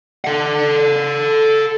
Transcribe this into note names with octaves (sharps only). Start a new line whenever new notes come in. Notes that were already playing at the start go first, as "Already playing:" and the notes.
A4 F#5